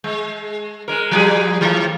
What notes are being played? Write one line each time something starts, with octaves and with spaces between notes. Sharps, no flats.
G#3
G#3 A#4
F3 G3 G#4
E3 A3